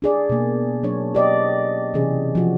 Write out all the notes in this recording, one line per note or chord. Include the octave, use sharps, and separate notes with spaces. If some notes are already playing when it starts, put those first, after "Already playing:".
D4 G#4 D5
B2 A#3
F#3 D4 C#5
G4 D5 D#5
C3 E3 C#4 G#4
F3 F#4